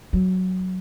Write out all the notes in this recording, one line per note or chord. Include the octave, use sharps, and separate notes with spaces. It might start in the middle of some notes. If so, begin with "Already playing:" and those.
F#3